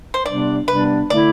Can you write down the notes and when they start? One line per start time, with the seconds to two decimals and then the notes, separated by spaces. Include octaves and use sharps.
0.14 C5
0.26 C3 G3 B3 D4 D5
0.68 C3 G3 B3 D4 B4
1.10 D3 A3 E4 D5